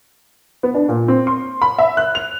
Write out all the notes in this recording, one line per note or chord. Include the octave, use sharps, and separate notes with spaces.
B3
D4
A#2
C4
C6
B5
E5
F#6
F7